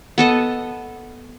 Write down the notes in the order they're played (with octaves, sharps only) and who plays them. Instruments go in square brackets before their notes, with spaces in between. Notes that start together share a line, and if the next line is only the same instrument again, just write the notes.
[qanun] B3 A4 D#5